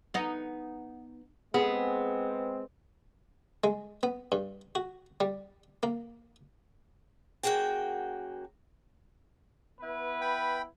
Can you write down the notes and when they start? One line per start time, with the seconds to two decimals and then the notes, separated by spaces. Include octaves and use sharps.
0.14 B3 D#4
1.54 G#3 B3 C4 G#4
3.64 G#3
4.03 B3
4.32 G2
4.75 F#4
5.20 G3
5.83 A#3
7.43 F#2 A#3 F#4 G#4 G5
9.81 B3 E4 B4
10.21 G5 B5